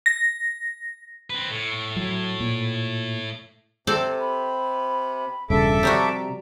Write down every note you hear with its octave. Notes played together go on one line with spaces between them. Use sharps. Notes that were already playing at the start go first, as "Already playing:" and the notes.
A#6
C4 B4
A2
F#3
A#2
C3 C4 A4 D5
B5
E1 G2 C#3 A4 E5 D6
C3 F3 G3 F#4 A#5